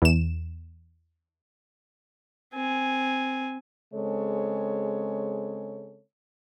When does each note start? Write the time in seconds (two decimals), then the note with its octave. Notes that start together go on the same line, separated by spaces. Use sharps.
0.02 E2 E7
2.54 C4 G#5
3.92 C#3 G#3 C4 A4 C#5